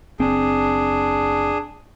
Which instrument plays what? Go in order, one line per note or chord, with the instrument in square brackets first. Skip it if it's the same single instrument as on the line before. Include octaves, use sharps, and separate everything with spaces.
[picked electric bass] F#1 C4 [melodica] D4 G#4